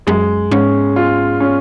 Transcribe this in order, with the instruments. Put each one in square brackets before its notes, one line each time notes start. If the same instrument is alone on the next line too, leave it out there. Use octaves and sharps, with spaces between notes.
[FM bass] F#2 [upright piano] G#3
[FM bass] G#2 [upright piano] C#4
[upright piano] F4
C#4